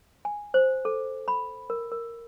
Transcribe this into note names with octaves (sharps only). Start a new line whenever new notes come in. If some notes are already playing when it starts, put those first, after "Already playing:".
G#5
C5
A4
B5
A#4
A#4